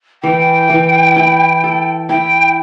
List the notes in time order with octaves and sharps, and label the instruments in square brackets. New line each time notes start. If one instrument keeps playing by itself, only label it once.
[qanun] E3 [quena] G5
[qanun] E3
E4
A4
[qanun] E4 [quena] G5